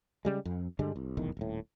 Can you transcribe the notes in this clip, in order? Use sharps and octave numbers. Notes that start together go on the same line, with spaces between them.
C#3 G3 G#3
F2
G2 D3 G3 G#3
C2
F1 B1 E2 D#3
D#1 A2